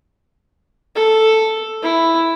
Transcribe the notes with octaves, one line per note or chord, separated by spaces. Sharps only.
A4
E4